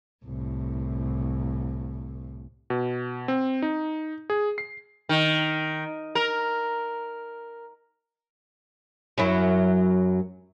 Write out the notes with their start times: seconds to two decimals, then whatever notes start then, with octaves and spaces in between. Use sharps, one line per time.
0.25 C2 A2
2.70 B2
3.28 C4
3.62 D#4
4.30 G#4
4.58 C7
5.09 D#3
6.15 A#4
9.18 F#2 F#3 E4